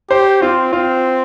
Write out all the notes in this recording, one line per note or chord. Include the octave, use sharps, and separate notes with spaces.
G4 C5
C4 F4
C4 F4